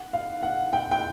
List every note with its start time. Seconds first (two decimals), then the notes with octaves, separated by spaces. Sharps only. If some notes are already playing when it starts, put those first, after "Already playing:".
Already playing: F#5
0.13 F5
0.43 F#5
0.73 G5
0.91 G5